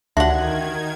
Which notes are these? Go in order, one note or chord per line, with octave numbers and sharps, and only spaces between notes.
D2 D#3 D4 F#4 G4 E5 F#5 G#6